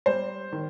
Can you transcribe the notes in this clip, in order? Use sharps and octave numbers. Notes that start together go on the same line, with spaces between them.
G3 C5
D#3